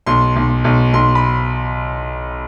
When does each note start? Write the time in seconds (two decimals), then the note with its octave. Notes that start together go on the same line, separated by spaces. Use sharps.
0.07 B1 C6
0.36 B1
0.64 B1
0.93 B1 C6
1.15 B5